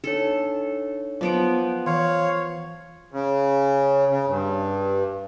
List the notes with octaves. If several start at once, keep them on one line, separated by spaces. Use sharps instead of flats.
D4 D#4 A4 C#5
F3 F#3 B3 G5
E3 C#5 F5 C6 G#6
C#3
C#3
G2